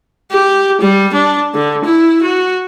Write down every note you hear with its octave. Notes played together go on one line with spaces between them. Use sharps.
G4
G3
D4
D3
E4
F#4